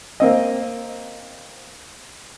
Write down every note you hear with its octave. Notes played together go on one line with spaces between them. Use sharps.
A#3 C4 D#5